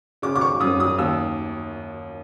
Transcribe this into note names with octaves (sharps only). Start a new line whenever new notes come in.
C#3 D6
D6
C#6
F#2 D#6
D#6
D#2 E6